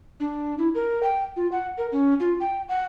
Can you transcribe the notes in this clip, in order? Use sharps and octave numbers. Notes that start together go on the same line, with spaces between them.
D4
E4
A#4
G5
F4
F#5
A#4
C#4
F4
G5
F#5